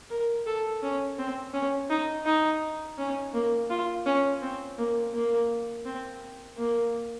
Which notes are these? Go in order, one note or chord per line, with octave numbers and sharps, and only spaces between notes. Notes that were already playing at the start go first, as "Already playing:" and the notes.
A#4
A4
C#4
C4
C#4
D#4
D#4
C#4
A#3
F4
C#4
C4
A#3
A#3
C4
A#3